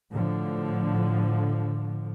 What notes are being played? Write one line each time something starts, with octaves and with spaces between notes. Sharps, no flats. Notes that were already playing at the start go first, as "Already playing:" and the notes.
A2 D3 F3